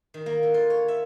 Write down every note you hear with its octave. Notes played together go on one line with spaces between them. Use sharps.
D#3
A#3
D3
F4
C#5
E5